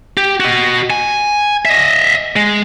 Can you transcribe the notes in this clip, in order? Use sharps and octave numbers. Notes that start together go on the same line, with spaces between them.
G4
F#4 D#5
G#5
D#5 E5
G#3